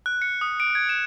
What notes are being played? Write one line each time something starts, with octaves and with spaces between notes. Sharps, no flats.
F#6
C#7
D#6
D7
G#6
E7